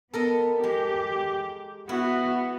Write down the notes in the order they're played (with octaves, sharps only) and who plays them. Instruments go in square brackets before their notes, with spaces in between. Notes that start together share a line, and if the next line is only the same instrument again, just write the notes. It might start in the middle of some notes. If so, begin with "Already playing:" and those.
[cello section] B3 [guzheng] A4 A#4 D#5
[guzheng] G#3 [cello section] G4
[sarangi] B3 [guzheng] E4 [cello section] F#4